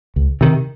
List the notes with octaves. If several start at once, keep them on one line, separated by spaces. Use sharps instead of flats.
C#2
C3 D#3